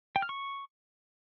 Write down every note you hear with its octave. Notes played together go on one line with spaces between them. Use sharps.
G5
F6
C#6